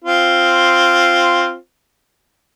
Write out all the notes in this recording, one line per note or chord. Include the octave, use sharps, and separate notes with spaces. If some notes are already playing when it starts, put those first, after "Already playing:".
C4 F4